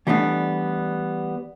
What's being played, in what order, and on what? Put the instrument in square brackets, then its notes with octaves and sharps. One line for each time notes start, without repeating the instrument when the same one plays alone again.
[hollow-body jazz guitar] E3 G3 A3 B3 D4